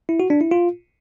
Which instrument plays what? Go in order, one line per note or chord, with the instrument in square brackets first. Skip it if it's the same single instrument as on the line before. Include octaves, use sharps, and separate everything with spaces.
[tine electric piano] E4
F#4
D4
E4
F4